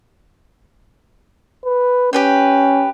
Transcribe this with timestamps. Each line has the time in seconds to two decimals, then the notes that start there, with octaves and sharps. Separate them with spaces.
1.65 B4
2.13 C#4 G4 B4 G5